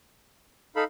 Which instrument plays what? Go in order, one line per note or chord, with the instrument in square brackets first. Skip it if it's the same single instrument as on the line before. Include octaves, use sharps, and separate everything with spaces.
[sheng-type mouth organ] D#4 F5 B5 [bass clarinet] A4